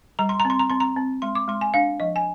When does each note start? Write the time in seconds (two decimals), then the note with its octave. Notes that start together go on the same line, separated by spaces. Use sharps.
0.19 G3 A#5
0.29 C6
0.40 A#5
0.45 C4 C6
0.59 A#5
0.70 C4 C6
0.80 A#5
0.97 C4
1.22 G#3 C6
1.35 D6
1.48 G#3 C6
1.61 G#5
1.74 D4 F5
2.00 F3 D#5
2.16 G#5